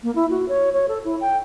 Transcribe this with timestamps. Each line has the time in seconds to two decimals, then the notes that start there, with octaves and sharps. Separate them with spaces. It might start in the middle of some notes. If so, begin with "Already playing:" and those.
0.04 A#3
0.15 E4
0.30 F#4
0.49 C#5
0.74 C#5
0.88 A4
1.05 E4
1.21 G5